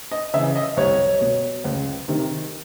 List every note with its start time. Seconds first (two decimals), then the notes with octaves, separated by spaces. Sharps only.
0.11 D#5
0.34 C#3 E5
0.37 E3
0.56 D#5
0.77 C2 C#5
1.21 B2
1.64 C#2
2.08 C3 D#3